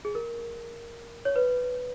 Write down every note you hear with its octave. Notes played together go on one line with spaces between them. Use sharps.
G#4
A#4
C#5
B4